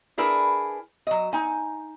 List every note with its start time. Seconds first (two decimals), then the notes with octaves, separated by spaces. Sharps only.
0.18 D4 E4 G#4 A#4 B4
1.07 F#3 D#5
1.33 D#4 G#5